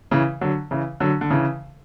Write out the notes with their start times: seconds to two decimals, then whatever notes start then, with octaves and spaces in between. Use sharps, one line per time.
0.11 C#3 E3
0.41 D3 F#3
0.71 C#3 E3
1.00 D3 F#3
1.21 D3
1.30 C#3 E3